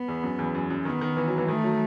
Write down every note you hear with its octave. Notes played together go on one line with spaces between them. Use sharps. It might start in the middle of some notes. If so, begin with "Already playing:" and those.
Already playing: B3
E2
F#2
E2
F#2
F#2
D#3 B3
D#3
E3
F#3
E3
D#3 A3
F#3